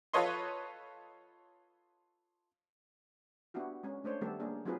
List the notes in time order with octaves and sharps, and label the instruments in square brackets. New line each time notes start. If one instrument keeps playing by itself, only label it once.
[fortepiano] F4 A4 B4 C#5 D#5 C6
[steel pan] B3 D4 E4 F#4 G4
G#3 C#4
A3 D4 C5 C#5
D#3 G3 A3 B3 G4 A4
A#3 D4 G#4
F#3 C4 D#4 F4 G#4 B4